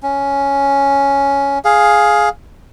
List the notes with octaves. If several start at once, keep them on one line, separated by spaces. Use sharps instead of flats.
C#4
G#4 F5